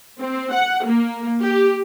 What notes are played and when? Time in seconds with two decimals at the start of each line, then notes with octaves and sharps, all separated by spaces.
0.21 C4
0.54 F#5
0.86 A#3
1.42 G4